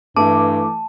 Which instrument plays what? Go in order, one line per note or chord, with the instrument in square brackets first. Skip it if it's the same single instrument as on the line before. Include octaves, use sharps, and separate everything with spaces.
[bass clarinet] G2 [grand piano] E3 A3 [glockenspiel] A5 [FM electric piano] D6